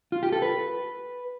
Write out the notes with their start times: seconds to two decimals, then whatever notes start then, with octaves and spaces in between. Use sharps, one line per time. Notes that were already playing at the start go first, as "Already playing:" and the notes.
0.12 F4
0.23 G4
0.32 A4
0.42 B4